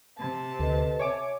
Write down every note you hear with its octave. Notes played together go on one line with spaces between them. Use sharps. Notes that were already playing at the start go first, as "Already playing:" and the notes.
C3 A5
D2 A4 B4 D#5
C#5 E5 G#5 D6